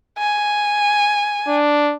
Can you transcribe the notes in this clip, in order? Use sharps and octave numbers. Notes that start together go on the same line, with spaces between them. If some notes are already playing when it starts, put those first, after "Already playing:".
G#5
D4